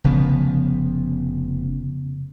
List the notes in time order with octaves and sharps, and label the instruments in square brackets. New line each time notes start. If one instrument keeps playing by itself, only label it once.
[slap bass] F1 C#3 F3 B3